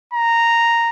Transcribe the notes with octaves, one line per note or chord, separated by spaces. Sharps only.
A#5